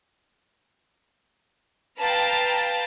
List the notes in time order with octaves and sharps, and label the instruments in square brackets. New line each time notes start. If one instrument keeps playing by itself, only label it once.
[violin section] B4 F5 G5 A5 A#5 A6